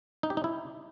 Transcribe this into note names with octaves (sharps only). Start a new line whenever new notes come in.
D#4
G4
D#4
E4